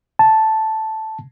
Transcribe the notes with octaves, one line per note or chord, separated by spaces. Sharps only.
A5